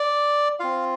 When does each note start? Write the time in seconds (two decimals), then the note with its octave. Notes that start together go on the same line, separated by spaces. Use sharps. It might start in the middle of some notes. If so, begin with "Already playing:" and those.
Already playing: D5
0.60 C4 F4 F5